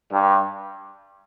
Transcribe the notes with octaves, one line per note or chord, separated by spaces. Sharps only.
G2